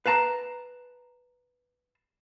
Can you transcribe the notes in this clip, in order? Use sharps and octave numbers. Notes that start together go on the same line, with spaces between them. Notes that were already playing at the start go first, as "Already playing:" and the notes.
B4 F5 A5 A#5